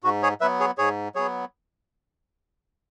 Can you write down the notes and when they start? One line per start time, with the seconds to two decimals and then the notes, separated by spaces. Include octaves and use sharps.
0.04 G#2 F#4
0.23 G#4 C#5
0.41 F#3 B3 B4 E5
0.60 G#4 C#5
0.78 G#2 G#4 C#5
1.15 F#3 B3 G#4 C#5